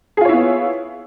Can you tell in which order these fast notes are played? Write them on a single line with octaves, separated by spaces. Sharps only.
G#4 F4 C#5 E4 B3